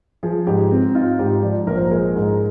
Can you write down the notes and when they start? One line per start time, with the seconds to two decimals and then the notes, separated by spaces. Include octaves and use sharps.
0.23 F3 G#4
0.47 G#2 G4
0.71 C4
0.95 D#4 F4
1.19 G#2 G4
1.43 F3 D5
1.67 A#1 A#4
1.77 C5
1.87 G#3 A#4
2.16 G#2